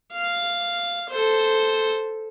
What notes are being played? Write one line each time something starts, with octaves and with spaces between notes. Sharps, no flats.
F5
A4 C5